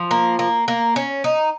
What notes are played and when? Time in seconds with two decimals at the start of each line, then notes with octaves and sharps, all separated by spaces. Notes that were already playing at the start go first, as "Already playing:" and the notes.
Already playing: F3
0.11 A#3
0.39 A#3
0.68 A#3
0.96 C#4
1.24 D#4